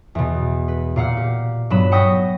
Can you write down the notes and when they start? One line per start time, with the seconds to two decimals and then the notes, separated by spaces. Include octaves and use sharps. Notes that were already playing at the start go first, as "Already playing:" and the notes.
0.15 E2 B2
0.68 B4
0.96 A#2 F5 F#5 F6
1.17 G4
1.70 G2 F#3 B3 B5 E7
1.92 F#5 G5 C#6 D#6 A#6 B6